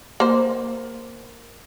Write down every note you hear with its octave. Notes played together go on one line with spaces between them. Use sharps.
A#3 C5